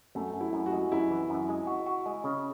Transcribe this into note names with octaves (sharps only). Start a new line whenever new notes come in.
F#2 A3
F#2
E4
F#2
F#4
G#3
F#2 E4
E3
F#2
G#3
F#4
F#4
G#3
C#3